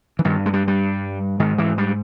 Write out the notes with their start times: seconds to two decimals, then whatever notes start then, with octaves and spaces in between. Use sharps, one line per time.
0.19 E3
0.25 G2 D#3
0.46 G#3
0.53 G3
0.68 G3
1.40 G#2 D#3
1.58 E3
1.78 G3